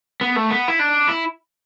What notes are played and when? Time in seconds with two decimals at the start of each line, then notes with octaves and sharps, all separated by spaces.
0.21 B3
0.36 A3
0.51 B3
0.68 E4
0.79 D4
1.08 E4